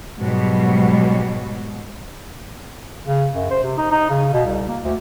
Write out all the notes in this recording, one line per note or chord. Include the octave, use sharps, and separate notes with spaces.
G#2 B2 F#3 G3
C#3
F#2
C5
C3
D#4
D#4
C#3
B2
C2
A#3
D2